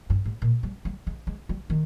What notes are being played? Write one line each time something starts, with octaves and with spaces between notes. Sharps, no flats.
G2
G#2
A#2
G3
G3
G#3
G#3
G3
D#3